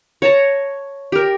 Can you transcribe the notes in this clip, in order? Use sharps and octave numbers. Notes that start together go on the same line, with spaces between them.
C#5 A5 A#5
G4 A#4